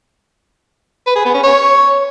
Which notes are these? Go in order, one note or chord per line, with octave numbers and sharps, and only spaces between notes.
B4
G#4
B3
C#4
C#5